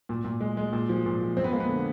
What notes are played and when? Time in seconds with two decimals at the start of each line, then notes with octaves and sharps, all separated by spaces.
0.09 A#2
0.25 A#2
0.41 G#3
0.57 G#3
0.73 A#2
0.89 F3
1.06 A#2
1.21 F3
1.37 F2 C4
1.44 B3
1.53 G#3 A#3
1.60 B3
1.69 D3